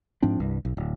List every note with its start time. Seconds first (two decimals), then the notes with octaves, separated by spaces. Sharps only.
0.22 G#2 F3 C4 D4
0.40 C2 G2
0.65 B1
0.77 D1